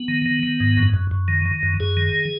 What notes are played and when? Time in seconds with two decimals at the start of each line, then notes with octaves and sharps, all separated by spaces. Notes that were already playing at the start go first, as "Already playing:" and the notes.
Already playing: B3
0.08 D#3
0.26 D#3
0.43 D#3
0.60 G#2
0.77 F#2
0.94 F#2
1.11 F#2
1.28 D#3
1.46 D#3
1.63 F#2
1.80 F#2 G#4
1.97 D#3